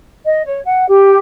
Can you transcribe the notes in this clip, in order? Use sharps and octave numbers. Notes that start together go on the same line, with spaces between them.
D#5
C#5
F#5
G4